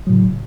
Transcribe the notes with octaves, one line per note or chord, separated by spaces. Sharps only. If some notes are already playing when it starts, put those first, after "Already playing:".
A2 C#3 F#3